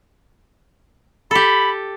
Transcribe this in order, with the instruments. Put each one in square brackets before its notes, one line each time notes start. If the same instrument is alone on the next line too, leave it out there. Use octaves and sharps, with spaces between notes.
[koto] G4 A4 [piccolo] B5